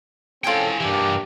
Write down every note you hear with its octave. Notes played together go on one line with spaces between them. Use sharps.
E3 C4 C#4 F4 G#4 A4 G5 G#5
G2 E3 A#3 D4 G4